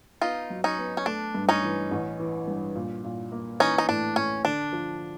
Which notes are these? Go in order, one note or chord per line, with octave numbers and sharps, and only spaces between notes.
B3 D#4 F4
F#3
C#4 D#4
B3
C#4
A3 D4
G2
C#4 D#4
E3
A1
E3
G2
A#2
A#2
A#3
E3 C#4 D#4
D#4
A2 D4
A2 C#4
D3 D4
F3